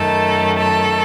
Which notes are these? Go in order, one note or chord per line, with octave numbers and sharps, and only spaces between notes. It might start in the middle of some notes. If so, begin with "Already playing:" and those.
Already playing: F#2 D#3 A3 A4
A4